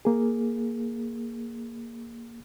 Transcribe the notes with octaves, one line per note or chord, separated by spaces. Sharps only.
A#3 G#4